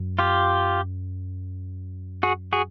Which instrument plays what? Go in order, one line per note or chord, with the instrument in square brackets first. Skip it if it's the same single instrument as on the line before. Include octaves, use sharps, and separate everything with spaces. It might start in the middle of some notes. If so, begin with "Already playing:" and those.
Already playing: [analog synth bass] F#2
[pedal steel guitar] F4 G4
F#4 G#4
F#4 G#4